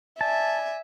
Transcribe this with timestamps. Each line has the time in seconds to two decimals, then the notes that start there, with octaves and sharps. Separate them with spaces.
0.21 D5 E5 G#5 A5